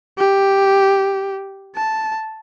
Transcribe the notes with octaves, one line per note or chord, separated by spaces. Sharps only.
G4
A5